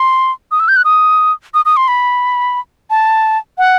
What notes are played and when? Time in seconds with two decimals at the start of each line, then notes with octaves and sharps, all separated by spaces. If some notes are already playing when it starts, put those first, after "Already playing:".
Already playing: C6
0.51 D#6
0.60 E6
0.68 G6
0.76 F#6
0.85 D#6
1.54 D#6
1.65 D#6
1.77 C6
1.88 B5
2.90 A5
3.58 F#5